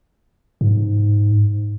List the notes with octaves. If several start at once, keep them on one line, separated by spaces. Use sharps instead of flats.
G#2